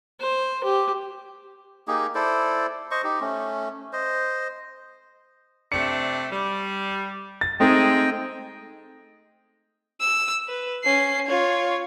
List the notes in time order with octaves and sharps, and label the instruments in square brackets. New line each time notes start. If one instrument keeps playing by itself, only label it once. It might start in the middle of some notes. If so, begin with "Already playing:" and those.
[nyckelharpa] C5
G4
[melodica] A#3 D#4 G4 G#4
E4 A4 C5 D5
C5 D#5 C#6
D#4 G4
A3 C#4
C5 D#5
[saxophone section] C3 A3 D4 [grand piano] C#7
[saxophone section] G3
[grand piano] A6
[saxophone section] G#3 [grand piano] A3 C4 D#4 [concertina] D#5 G5
[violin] E6
B4
C#4 C7
F4 C#5